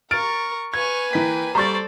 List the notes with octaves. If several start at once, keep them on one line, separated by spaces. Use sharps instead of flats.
A#4 C#6 F6 A6 D7
B4 G#5 C#6 G#6 F7
E3 A#3 G5 B6
G3 A4 C5 D5 A#5 C#6 A6